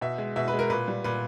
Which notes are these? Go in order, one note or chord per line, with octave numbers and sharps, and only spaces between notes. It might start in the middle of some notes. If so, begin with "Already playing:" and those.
B2 E5
G#3
B2 E5
B4
G#3
A#4
A#2 B4
G3
A#2 B4